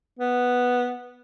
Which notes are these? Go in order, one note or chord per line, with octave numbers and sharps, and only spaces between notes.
B3